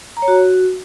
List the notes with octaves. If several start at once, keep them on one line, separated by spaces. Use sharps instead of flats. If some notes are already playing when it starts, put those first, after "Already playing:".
A#5
C#5
F#4